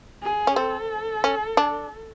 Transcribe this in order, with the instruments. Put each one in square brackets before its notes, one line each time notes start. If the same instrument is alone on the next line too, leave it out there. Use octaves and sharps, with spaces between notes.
[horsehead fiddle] G#4
[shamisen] C#4
[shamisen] C4 [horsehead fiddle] A4
[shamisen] C#4
D4